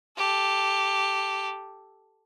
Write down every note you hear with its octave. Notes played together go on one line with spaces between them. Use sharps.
G4 A4